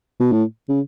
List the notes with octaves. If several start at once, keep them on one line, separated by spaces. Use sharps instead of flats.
B2
A2
C#3